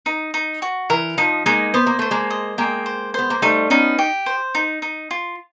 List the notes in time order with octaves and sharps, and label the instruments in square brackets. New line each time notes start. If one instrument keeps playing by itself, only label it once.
[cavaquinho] D#4
D#4
F#4
[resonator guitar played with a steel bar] E3 [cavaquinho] A#4
[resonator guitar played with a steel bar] F3 [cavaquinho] D#4
[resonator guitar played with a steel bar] G#3 A#3 [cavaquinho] D#4
[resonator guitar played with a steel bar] B3 [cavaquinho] C5
[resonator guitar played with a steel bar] A#3
[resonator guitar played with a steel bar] A3 [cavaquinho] C5
[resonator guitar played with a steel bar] G#3 A#3
[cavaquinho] D#5
[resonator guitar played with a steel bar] G#3 A#3 [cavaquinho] G5
[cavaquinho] C5
[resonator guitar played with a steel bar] B3 [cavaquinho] C5
[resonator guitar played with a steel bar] A#3
[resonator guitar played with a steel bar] G3 A3 [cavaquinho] D#4
[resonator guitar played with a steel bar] B3 C#4 [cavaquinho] D#4
[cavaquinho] G4
C5
D#4
D#4
F4